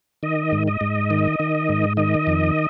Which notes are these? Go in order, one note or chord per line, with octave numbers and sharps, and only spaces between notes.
D#3 D#5
G#2
D#5
G#2
D#3
D#3
G#2
D#3 D#5
F2